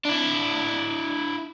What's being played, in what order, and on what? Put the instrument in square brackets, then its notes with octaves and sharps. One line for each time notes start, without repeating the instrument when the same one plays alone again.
[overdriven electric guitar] D4 E4